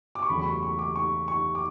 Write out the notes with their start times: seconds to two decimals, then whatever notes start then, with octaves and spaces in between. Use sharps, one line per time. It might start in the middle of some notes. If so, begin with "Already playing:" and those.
0.15 D6
0.22 C#6
0.29 E2 C#3 F#3 A3 B5
0.39 B5
0.46 C#6
0.63 C#6
0.79 D6
0.96 C#6
1.28 C#6
1.55 D6